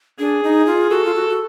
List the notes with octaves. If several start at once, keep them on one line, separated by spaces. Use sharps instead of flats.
D4 G#4
D#4
F4
F#4 A4
F4
F#4
F#4